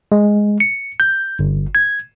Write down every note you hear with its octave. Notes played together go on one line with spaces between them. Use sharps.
G#3
C#7
G6
G1
G#6